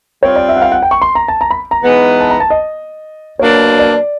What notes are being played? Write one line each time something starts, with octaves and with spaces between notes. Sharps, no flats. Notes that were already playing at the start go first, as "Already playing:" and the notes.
G3 C4 F4 C#5
D5
E5
F#5
F5
F#5
G5
C#6
C6
A#5
A5
A#5
B5
A#5
E3 G#3 B3 D#4
A5
A#5
A5
D#5
B2 F#3 A#3 D4 C#5
D5